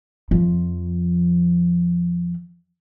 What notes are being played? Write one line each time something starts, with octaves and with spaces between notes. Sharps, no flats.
F2 F3